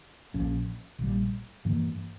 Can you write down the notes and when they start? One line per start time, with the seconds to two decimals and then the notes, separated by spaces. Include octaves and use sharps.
0.34 A#1 A#2 F3 C#4
0.99 A#1 A#2 G3
1.65 G2 E3 G3 A#3